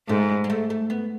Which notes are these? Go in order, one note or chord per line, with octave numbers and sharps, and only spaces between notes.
G#2 A3
G#3
A3
A3
B3